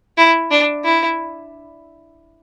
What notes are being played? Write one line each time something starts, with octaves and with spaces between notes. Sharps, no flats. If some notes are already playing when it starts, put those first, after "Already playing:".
E4
D4
E4